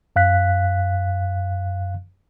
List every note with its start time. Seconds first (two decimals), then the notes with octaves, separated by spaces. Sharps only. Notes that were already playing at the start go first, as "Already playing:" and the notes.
0.16 F#2 F5 F#6 B6